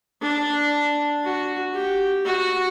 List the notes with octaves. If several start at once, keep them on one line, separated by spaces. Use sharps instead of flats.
D4
F#4
G4
F#4